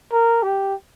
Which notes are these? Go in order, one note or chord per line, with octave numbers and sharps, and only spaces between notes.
A#4
G4